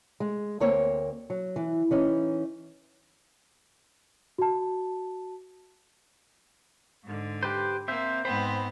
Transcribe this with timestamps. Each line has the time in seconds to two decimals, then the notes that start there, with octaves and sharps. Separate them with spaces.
0.20 G#3
0.60 D2 A#3 C4 C#5
1.30 F#3
1.56 E3
1.91 E3 C#4 D#4
4.38 F#4 A5
7.05 G#2 D3
7.43 G4 B4 C5
7.88 A#3 C4 C5 E5
8.25 G#2 B3 C4 C5 B5